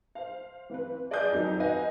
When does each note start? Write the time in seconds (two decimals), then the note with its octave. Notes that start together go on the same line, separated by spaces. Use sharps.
0.15 C5 F5
0.70 E3 C4 B4
1.11 G#4 D5 D#5 G#5 D#6 G6
1.32 F2 D#3 F#3 D#4
1.60 B4 D#5 F5 F#5 G#5 A#6